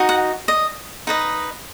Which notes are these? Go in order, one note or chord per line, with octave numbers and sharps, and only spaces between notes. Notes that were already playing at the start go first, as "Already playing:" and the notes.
Already playing: D#4 F#4 D#5
F#5
D#5
D#4 B4 D#5